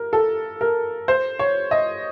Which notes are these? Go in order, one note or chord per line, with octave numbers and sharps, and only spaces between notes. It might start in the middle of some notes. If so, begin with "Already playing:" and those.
Already playing: A#4
A4
A#4
C5
C#5
D#5